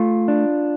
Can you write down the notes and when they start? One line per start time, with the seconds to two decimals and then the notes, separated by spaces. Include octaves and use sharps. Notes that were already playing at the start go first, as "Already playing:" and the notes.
Already playing: A3 F4
0.28 D4